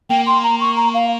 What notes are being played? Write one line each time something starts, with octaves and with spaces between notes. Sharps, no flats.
A#3 G5
C6
A#5
C#6
A#5
F5